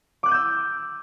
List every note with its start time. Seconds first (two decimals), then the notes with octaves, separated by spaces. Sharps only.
0.23 D6
0.26 F#6
0.29 D#7
0.31 G6
0.34 E6